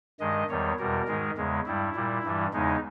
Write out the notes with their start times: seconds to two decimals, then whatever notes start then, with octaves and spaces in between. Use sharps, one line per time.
0.20 G2 D#3 G#3 D#5
0.49 E2 D#3 G3 C#5
0.79 E2 B2 G3 A#4
1.08 G#2 D#3 G#3
1.37 E2 C#3 G#3
1.66 G2 G3 E4
1.96 A#2 G3
2.24 G2 E3 G3
2.53 E2 C#3 G#3 D#4